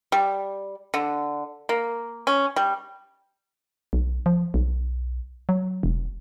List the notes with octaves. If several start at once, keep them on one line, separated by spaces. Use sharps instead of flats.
G3
D3
A#3
C#4
G3
B1
F3
B1
F#3
E1